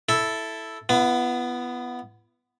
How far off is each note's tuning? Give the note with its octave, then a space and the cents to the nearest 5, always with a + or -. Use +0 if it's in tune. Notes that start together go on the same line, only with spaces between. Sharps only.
E4 +0 A4 +0
B3 +0 E4 +45